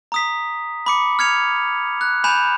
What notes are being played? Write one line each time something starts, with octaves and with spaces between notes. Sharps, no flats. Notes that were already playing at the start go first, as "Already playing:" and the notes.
A#5 D#6 B6
B5 D6 C#7
F6 G#6 C#7 F7
F#6
G#5 B5 G6 E7 F7